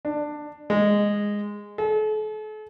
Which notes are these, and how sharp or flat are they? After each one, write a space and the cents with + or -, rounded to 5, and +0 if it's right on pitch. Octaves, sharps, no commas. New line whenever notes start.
D4 +15
G#3 -10
A4 -40